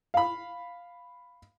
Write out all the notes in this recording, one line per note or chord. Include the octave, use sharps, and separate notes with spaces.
F5 B5